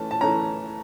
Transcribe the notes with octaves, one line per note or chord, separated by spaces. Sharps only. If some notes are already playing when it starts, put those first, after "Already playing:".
Already playing: E3 A3 C#4 A5
A5
E3 A3 C#4 A#5